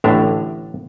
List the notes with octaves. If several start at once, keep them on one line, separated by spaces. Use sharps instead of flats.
A1 A2 D3 D4 E5 A#5